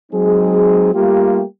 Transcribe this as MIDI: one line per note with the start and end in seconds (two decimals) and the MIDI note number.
0.12 0.92 54
0.12 0.92 56
0.12 0.92 60
0.12 0.92 63
0.12 0.92 68
0.94 1.42 55
0.94 1.42 57
0.94 1.42 58
0.94 1.42 65
0.94 1.42 67